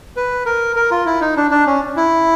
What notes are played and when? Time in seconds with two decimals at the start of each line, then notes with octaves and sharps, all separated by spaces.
0.16 B4
0.46 A#4
0.76 A#4
0.91 F4
1.06 E4
1.21 D#4
1.37 D4
1.51 D4
1.67 C#4
1.97 E4